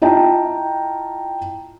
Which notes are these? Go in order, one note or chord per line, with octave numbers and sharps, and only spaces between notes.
E4 F4 D#5 G5 A5 A#5